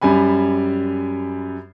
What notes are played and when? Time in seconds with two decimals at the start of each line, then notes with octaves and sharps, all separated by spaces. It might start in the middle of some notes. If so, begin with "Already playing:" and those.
0.02 F#2 G3 G#5 B5